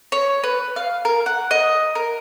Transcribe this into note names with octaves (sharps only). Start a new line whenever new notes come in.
C#5
B4
F5
A#4
F#5
D#5
A#4